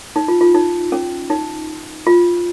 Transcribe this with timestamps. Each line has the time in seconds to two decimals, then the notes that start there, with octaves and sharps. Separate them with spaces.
0.16 D#4
0.28 F4
0.41 F4
0.54 D#4
0.92 C#4
1.30 D#4
2.07 F4